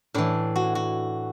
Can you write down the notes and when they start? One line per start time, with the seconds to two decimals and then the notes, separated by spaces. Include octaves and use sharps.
0.14 A2 E3 D4
0.56 F#4
0.75 F#4